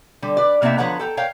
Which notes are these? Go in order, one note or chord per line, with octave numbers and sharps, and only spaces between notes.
D3 G3
B4 D5
C3 A#3 B3 D#4 E5
D3 F3 B4 C#5 F#5 A#5
A4 G5 A#5
A#4 C#5 F5 G5